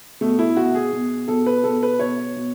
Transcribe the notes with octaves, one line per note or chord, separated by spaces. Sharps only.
B2 A3
E4
B2 F#4
G#4
B2
B2 A4
B4
B2 A4
B4
B2 C#5
B2